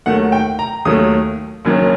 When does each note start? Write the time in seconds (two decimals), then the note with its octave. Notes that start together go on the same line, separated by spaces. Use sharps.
0.06 D#2 D#3 F#3 A3 F#5
0.32 G5
0.59 A#5
0.85 D#2 D#3 F#3 A3 D#6
1.65 F#1 F#2 D#3 F#3